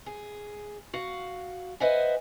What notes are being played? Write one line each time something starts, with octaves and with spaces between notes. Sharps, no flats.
G#4
F#4 F5
B4 C5 D#5 E5 F#5 G#5